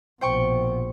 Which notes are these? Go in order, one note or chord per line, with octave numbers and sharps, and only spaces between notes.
A#1 B2 C5 G5 C#6